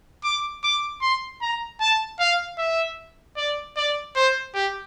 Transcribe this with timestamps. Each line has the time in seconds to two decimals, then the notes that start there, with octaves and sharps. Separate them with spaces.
0.24 D6
0.64 D6
1.02 C6
1.42 A#5
1.80 A5
2.19 F5
2.58 E5
3.36 D5
3.76 D5
4.16 C5
4.54 G4